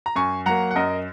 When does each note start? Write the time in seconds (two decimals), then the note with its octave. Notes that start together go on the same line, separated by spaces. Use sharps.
0.06 A#5
0.16 F#2 G#5 C#6
0.46 F#3 A#3 F#5 A#5
0.71 F#5
0.75 F#2 A#4 D#5